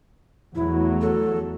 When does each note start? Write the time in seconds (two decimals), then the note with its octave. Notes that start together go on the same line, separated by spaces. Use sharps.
0.55 E2 F#3 A3 E4
1.01 A4